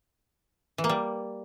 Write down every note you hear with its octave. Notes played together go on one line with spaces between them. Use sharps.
E3
A#3
G3